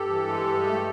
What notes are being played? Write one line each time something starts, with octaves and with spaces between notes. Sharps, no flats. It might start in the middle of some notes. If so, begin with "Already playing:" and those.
Already playing: G2 G4 A4
E3
G#3
G2
A3